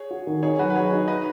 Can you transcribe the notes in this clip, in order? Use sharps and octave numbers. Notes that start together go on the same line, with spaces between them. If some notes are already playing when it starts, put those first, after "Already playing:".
Already playing: G#4 C#5
F#4
D#3
D#4 G#4 C#5
F#3 F#4 B4
B4
F#3 G#4 C#5
D#4
B4 D#5